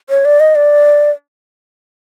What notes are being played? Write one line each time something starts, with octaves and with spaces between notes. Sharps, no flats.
C#5
D5
D#5
D5